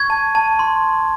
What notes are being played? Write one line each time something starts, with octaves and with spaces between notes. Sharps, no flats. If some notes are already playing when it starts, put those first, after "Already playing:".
Already playing: C#6 G#6
A5
A5
C6